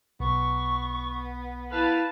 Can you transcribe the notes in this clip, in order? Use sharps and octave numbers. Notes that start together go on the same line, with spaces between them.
B1 B3 C#6
E4 B4 F5 A5